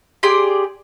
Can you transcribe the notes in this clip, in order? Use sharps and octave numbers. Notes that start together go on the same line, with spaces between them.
G4 G#4 D5 C6